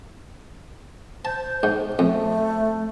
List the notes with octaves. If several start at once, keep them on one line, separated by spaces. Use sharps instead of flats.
C5 A5
G#2
F2 A3